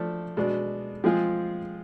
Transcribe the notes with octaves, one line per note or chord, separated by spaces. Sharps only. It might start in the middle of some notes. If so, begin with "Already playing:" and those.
Already playing: F3 A3 D4 A4
B2 G#3 D4
F3 G#3 C4 F4 G#4